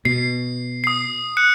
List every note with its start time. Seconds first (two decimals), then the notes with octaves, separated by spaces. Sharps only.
0.05 B2 C7
0.84 D#6 C7
1.37 F#6 C#7